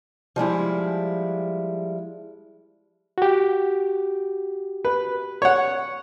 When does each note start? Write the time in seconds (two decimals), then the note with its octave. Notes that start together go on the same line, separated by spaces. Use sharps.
0.36 F3 G3 G#3 E4
3.18 F#4 G4
4.85 B4
5.42 C#5 F#5